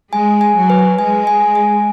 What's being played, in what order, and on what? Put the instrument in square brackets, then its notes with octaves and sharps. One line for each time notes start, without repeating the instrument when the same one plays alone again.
[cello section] G#3 [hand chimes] G#5
[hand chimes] G#5
[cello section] F#3
[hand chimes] B4
[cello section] G#3 [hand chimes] G#5
[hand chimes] G#5
G#5